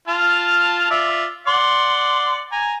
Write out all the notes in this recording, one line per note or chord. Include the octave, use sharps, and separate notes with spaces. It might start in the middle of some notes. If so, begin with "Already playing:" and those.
F4 A5 F6
F4 D5 E5
D5 F#5 C6
G#5 A#5